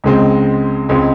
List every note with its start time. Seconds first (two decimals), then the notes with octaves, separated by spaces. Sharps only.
0.04 C#2 C#3 G#3 C4
0.89 C#2 C#3 G#3 C4